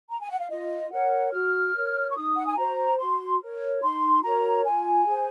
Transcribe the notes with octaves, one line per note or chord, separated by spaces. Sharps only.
A#5
G#5
F#5
F5
F4 D#5
A#4 C#5 F#5
F#4 F6
A#4 C#5
C#6
D#4 D#6
F#5
G#5
F#4 C5 A#5
F#4 C6
A#4 C#5
D#4 C6
F#4 A#4 C#5 A#5
F4 G#5
G#4 C5